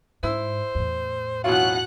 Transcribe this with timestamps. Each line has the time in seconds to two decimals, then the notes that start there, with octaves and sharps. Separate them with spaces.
0.23 G#2 E4 C5 E6
0.75 E2 A2
1.44 B2 E3 F#3 F4 F#4 F#5 F#6